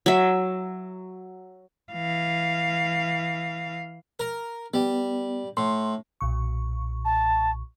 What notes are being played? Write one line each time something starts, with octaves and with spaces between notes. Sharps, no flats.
F#3 E5
E3 F5
A#4
G3 B3
A2 C6
B1 A#2 C#6
A5